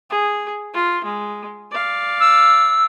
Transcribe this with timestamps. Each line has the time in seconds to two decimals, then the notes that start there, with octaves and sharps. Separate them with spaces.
0.10 G#4
0.74 F4
1.05 G#3
1.71 D5 F5
2.20 E6